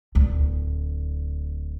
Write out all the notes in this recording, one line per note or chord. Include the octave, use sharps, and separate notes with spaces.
D1 D2